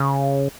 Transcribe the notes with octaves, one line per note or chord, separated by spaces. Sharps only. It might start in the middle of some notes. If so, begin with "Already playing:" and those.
Already playing: C#3